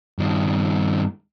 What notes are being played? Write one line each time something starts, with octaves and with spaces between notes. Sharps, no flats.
G2 D#3